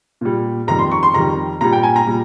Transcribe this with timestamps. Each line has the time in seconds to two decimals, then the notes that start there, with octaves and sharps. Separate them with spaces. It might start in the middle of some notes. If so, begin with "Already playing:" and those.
0.21 A#2 G3
0.67 F2 D#3 G3 A#5
0.79 C6
0.92 C#6
1.03 C6
1.14 F2 D#3 G3 A#5
1.61 A#2 G3 A#5
1.73 G5
1.83 G#5
1.96 A#5
2.07 A#2 G3